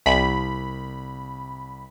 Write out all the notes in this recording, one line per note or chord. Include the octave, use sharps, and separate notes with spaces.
C2 B5